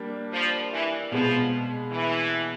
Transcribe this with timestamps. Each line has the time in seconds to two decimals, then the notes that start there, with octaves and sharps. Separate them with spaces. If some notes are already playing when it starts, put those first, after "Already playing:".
Already playing: G3 A#3 D4
0.33 F3
0.73 E3
1.11 B2 F3 G#3 B3
1.91 E3